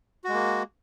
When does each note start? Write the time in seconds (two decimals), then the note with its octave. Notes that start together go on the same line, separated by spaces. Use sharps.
0.24 F#4
0.29 G#3
0.34 A#3